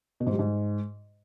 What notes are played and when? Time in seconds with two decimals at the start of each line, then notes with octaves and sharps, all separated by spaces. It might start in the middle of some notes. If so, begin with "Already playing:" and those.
0.20 B2
0.27 G#2
0.33 G3
0.39 G#2